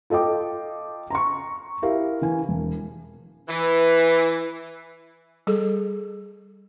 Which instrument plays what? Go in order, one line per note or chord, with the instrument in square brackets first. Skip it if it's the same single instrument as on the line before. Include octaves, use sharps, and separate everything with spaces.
[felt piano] F4 A4 D#5 G5 D6
A#5 C6 C#6
E4 G4 A#4 E5 F5
E3 G#5
E1
[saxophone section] E3
[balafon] G3 G#4 A4